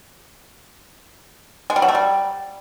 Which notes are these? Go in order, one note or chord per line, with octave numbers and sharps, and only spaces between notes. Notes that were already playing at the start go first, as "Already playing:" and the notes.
G#3
G3
F#3
A3
G3